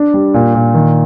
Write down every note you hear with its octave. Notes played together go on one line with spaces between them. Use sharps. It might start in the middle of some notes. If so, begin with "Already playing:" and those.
Already playing: D4
G3
A#2
A#2
D#3